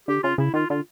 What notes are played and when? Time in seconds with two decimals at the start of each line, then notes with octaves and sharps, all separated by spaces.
0.08 D3 G4
0.23 C#3 F4
0.38 C#3 E4
0.54 D#3 F4
0.70 D3 F4